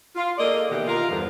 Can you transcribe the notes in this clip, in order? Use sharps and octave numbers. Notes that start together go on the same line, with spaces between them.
F4
A#3 G#4 A4 D5 D#5
B2 D#3 E3 F#4 G4
F4 A#4
E2 G2 D3 F3